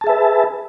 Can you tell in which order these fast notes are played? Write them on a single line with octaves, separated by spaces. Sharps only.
A5 G#4 E5 B4